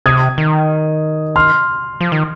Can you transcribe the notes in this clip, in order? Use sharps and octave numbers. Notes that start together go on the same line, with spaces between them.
C3 D#6 G#6
D#3
C6 F6
F3
D#3